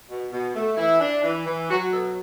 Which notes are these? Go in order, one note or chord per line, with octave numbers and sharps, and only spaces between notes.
B2
B2
A3
E3 E4
D4
E3
E3
F#3 F#4
B2 A4